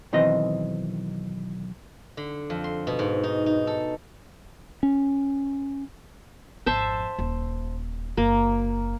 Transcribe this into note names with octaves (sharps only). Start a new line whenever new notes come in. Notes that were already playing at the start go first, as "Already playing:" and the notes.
B1 D#3 E3 C4 D#5
D3
F2
C6
B2
G#2
D#4
D#4
A4
C#4
G#1 F2 C5 E5 A5
D#1
F#1 A#3